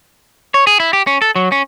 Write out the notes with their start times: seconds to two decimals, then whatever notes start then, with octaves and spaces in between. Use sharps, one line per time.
0.54 C#5
0.67 G#4
0.80 E4
0.93 G4
1.07 C#4
1.22 A4
1.36 F#3
1.52 C#4